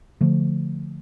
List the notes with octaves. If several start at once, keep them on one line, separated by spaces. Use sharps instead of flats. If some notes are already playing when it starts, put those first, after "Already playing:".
D3 F3 A3